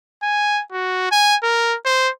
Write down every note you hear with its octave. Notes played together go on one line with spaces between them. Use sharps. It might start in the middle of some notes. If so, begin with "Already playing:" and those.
G#5
F#4
G#5
A#4
C5